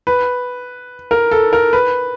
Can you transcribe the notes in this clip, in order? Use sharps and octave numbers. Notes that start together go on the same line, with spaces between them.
B4
A#4
A4
A#4
B4